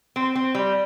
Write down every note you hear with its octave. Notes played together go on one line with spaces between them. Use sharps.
C4
C4
G3